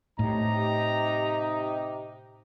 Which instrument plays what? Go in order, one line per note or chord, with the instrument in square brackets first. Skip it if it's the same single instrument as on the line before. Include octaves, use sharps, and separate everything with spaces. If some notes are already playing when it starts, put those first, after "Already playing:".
[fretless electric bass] A2 [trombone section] C3 D#4 G4 [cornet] A#5